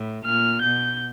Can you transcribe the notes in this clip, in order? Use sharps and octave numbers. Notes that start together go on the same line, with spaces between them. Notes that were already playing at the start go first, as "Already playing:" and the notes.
Already playing: A2
A#2 F6
B2 G6